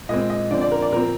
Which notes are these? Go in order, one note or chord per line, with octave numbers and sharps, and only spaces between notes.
A#2 G#3 C4 D#5
D#5
D3 F3 C4 D5
D5
A#4
D5
A#2 F3 C4 A#4